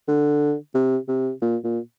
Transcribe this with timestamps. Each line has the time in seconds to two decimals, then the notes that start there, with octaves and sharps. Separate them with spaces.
0.08 D3
0.74 C3
1.08 C3
1.41 A#2
1.64 A#2